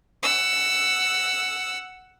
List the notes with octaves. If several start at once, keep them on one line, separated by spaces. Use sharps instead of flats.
F#5 E6